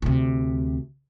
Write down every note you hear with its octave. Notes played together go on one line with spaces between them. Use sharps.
D2 C3